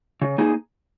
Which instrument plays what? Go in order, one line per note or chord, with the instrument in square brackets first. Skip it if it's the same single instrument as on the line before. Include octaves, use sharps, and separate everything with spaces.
[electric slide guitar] C#3
A#3 D#4 G#4